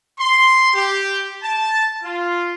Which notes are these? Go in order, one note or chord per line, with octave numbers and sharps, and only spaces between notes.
C6
G4
A5
F4